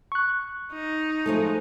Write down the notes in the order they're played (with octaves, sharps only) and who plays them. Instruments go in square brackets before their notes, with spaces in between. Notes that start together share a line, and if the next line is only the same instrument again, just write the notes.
[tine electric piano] C#6 F#6
[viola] D#4
[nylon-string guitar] F3 G#3 A3